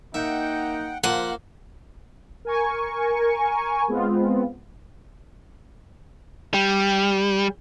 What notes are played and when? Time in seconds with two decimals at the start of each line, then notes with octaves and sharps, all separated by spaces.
0.14 A#3 D#4 E5 F#5 G5
1.03 F3 A#3 C5 F#5
2.45 A#4 G#5 C#6
3.88 G#3 B3 C4 F4
6.54 G3